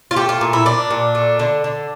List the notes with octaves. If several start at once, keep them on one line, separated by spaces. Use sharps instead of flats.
F4
A3 G4
F4
A#2
E4
A#2 D4
A#2
A3
D3
D3